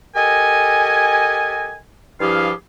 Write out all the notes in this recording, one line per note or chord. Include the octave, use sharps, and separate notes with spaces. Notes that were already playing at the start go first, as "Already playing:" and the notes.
G4 A4 A#4 D#5 G#5
G2 F3 E4 G4 G#4 F5